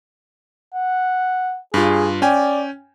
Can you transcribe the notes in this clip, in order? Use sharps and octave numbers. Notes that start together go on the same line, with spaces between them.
F#5
G2 F4 G#4
C#4 D5 G5 G#5